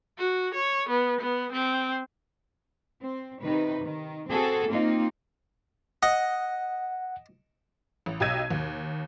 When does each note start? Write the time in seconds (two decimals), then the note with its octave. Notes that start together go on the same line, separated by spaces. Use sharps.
0.18 F#4
0.55 C#5
0.89 B3
1.21 B3
1.52 C4
3.02 C4
3.43 C3 D#3 D#4 B4
3.83 D#3
4.29 C4 F#4 G#4 A4
4.69 A#3 C4 D#4 F4
6.03 D#5 F#5
8.06 A1
8.20 B1 G4 D#5 E6 G#6 D#7
8.51 D#2